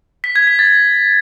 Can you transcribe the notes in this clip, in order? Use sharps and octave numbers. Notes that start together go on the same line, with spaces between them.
B6
G#6
B6
A6